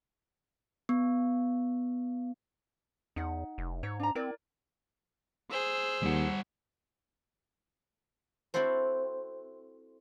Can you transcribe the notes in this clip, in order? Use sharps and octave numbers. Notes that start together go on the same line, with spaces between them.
B3
E2 D#4 F#5
F1
G#2 C#5
D4 A#5
C4 E4 A#4 D5
G#4 C5 E6
D#2 G3 F#5
C4 E4 F#4 A4 C5